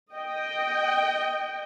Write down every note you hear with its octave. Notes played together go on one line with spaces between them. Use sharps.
D#5 G5